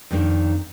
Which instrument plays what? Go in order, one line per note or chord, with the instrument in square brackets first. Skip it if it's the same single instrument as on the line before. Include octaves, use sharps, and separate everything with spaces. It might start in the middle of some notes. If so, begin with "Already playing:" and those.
[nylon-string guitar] F2 D#3 A#3 D4